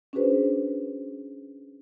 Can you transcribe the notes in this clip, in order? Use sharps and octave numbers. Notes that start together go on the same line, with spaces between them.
C#4 D4 F#4 G#4 B4 C5